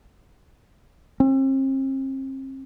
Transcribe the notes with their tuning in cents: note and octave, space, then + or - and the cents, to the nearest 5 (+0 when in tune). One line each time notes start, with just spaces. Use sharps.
C4 +40